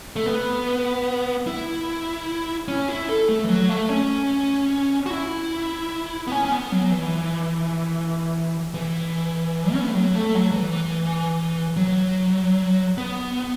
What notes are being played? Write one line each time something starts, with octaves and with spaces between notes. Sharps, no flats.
A3
B3
E4
C#4
E4
A4
A3
E3
F#3
A3
C#4
F#4
E4
B3
C#4
C#4
B3
F#3
E3
E3
C#4
B3
A3
F#3
A3
F#3
F#3
E3
F#3
B3